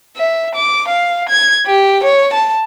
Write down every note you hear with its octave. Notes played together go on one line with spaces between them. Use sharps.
E5
D6
F5
G#6
G4
C#5
A5